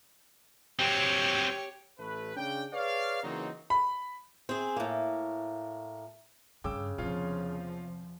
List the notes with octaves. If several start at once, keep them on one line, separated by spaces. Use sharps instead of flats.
F#3 C4 G4 C#5
A1 A3 B4
C#3 D4 G5
G#4 B4 C#5 D5 F5
C#3 E3 F#3 A#3 C4 D#4
B5
C4 G#4
A2 A#3
G2 C#3 G5 D6 E6
E2 C3 F3 F4 C#5 F5